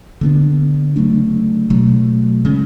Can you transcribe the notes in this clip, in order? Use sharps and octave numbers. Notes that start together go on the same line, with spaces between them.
D3 G#3 B3 D4
C#3 F#3 A3 D4
B2 F#3 A3
C#3 G#3 C#4